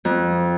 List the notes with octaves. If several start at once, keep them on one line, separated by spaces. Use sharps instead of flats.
F2